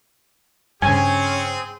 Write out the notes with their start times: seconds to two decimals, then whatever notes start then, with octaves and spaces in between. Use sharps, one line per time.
0.82 G2 C#3 C4 C#4 G#4 G#5